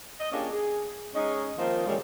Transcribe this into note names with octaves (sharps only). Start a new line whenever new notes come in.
D#5
A#3 C#4 D4 F4 G4 G#4
G#4
G#3 C#4 D#4
D#3 F3 A#3 C4 D#4 F4
F#2 A#2 C#3 E3 G3 G#3